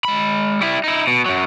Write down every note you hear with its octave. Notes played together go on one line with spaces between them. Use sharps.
G#3 B5
G3 E4
D#4 E4
B2
F#2 F#3